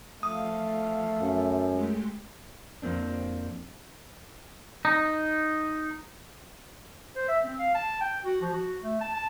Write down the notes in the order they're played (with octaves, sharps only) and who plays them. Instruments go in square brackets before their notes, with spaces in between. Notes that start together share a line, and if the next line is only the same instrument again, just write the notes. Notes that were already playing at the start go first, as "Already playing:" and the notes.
[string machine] F3 F5 [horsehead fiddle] A3 [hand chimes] D#6
[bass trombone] F#2
[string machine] G#3 A3 G4
[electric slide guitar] F2 F3 A#3 C4 D4
[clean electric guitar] D#4
[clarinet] C5
E5
C4
F5
A5
G5
F#4
F3
F#4
A3
A5
A5